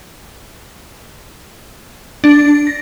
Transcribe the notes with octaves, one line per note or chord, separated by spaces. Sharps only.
D4
A#6